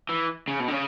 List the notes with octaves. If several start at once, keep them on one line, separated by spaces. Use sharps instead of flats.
E3
C#3
B2
D3
C#3